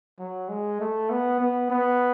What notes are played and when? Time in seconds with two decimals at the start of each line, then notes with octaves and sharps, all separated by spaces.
0.19 F#3
0.49 G#3
0.80 A3
1.10 B3
1.40 B3
1.70 B3